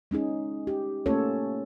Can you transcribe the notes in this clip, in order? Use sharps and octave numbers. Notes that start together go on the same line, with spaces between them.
G#3 C#4 D#4 G#4
G4
A3 A#3 C#4 F4 A4 C#5